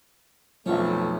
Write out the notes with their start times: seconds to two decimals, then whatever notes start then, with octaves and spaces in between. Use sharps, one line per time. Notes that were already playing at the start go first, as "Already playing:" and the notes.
0.66 B1 F2 F3 A3 B3 C#4 E5